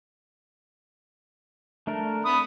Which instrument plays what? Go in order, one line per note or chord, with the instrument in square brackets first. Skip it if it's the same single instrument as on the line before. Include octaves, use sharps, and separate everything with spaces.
[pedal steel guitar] A3 D4 A#4
[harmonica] B5 D#6